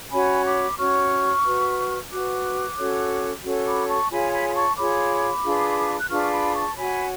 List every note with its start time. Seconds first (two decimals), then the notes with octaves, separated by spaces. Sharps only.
0.11 C#4 F#4 C#5 G#5 B5
0.45 B5 D6
0.78 C#4 F#4 C#5 C#6 F6
1.44 F#4 B4
2.11 F#4 B4 D6 F#6
2.77 C#4 F#4 A4 C#5
3.44 C#4 F#4 A4 C#5
3.66 B5 D6
3.88 A5 C#6
4.10 F4 G#4 C#5 G#5 B5
4.32 G#5 B5
4.49 B5
4.55 A5 C#6
4.77 F4 G#4 C#5 B5 D6
5.43 D4 F4 G#4 B4
5.99 F#6
6.09 D4 F4 G#4 B4 C#6 F6
6.23 C#6
6.31 B5 D6
6.54 A5 C#6
6.76 F#4 C#5 G#5 B5